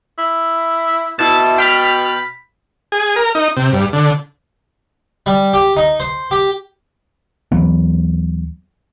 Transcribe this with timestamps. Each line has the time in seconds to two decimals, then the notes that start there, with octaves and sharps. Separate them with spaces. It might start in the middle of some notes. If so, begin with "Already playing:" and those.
0.18 E4
1.19 B2 E4 A5
1.58 G5 B5 F6 A6
2.92 G#4
3.16 A#4
3.35 D#4
3.57 C3
3.72 G2
3.93 D3
5.26 G3
5.53 G4
5.77 D#4
6.00 C5
6.31 G4
7.52 D#2 E3 F#3 B3